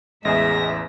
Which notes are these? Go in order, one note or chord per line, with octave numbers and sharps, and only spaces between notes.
A1 E2 G#3 E5 A#6